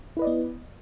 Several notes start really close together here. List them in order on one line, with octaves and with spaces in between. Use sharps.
E4 B4 D#5 D5 B3